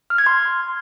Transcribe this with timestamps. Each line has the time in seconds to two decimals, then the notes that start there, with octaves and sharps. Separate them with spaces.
0.10 F6
0.18 G#6
0.26 C6